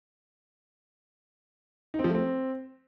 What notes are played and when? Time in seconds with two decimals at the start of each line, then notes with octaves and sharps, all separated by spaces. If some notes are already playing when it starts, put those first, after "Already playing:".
1.94 D#4
1.99 C4
2.04 F3
2.09 A3
2.15 C4